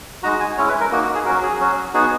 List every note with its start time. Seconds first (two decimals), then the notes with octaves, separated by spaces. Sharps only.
0.23 G#3 D#4 F#4 A#5
0.40 G#5
0.57 G#3 C#4 E4 C#5
0.69 B4
0.80 A#4
0.92 A#3 D#4 F#4
1.03 F#4
1.15 G#4
1.26 F#3 C#4 F#4 A#4
1.43 G#4
1.60 F#3 C#4 F#4
1.94 B3 D#4 F#4 G#4